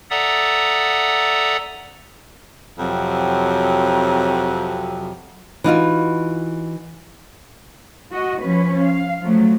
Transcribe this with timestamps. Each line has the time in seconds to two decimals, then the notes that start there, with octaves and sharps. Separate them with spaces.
0.10 A4 D5 E5 F#5 A#5 D#6
2.79 F2 C3 F#3
5.64 E3 D#4 F4 F#4
8.12 F#4 D#5
8.43 F3 C#4 B4
8.82 F5
9.23 F3 F#3 A3